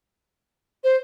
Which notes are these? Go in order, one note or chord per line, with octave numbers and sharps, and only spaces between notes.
C5